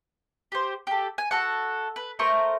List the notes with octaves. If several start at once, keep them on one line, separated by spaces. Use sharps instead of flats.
G4 C5
G4 A4
G#5
F#4 A4 F#5
B4
A3 A#4 C5 C#6